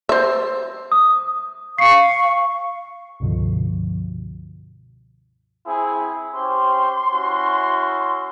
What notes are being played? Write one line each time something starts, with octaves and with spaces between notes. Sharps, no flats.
C5 E5
D#6
F5 C#6 C7 C#7
C#2 G2 B2 D3 F3
C4 E4 G#4
C#4 G4 C5 C6
C#4 E4 F#4